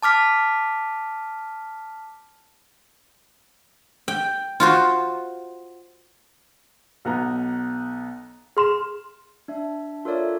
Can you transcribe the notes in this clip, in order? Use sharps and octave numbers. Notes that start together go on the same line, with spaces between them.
A5 D6 F6 B6
G5
F4 F#4 C5
B1 B3 A#5
G#4 C6 F6 E7
D4 E5
F4 A4 A#4 C#5 D5 E5